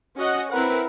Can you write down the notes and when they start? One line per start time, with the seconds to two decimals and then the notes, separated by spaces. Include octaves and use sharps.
0.16 C#4 F#4 D#5 F#5
0.51 C4 E4 A#4 B4 F#5